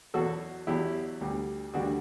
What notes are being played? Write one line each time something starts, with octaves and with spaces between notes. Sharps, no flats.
E2 B2 F#3 F#4 A4
E2 B2 F#3 E4 G4
D2 D3 G3
D2 D3 G3 D4 F#4